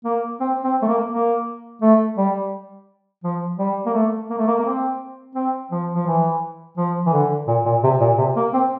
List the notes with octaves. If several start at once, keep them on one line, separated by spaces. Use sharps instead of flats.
A#3
C4
C4
A3
A#3
A#3
A3
G3
F3
G3
A#3
A3
A#3
A3
A#3
A#3
C4
C4
F3
F3
E3
F3
E3
D3
A#2
A#2
C3
A#2
C3
A#3
C4